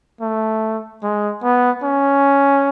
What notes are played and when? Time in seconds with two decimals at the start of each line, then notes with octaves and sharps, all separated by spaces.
0.21 A3
1.03 G#3
1.43 B3
1.84 C#4